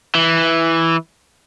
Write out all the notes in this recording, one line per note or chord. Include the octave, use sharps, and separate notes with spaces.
E3